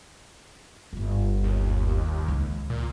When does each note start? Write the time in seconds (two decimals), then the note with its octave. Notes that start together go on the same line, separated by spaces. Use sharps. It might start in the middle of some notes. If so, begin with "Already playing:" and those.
0.93 D1 G1
1.43 D#2
2.28 C#2 D#3
2.70 A#2